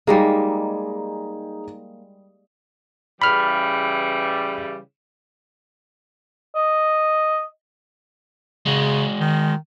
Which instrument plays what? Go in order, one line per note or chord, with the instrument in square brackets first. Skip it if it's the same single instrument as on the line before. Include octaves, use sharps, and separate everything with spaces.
[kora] G3 G#3 A#3 [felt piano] D#4 G#4
[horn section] C#3 E3 G3 [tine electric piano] B5 F6
[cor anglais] D#5
[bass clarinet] C#3 [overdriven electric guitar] G#3 F#4
[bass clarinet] D#3